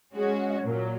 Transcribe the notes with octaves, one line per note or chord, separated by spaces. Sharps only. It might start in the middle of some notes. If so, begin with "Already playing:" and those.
G#3 C#4 F#4 G#4
F#5
D#5
C#5
A#2 F#3 A#4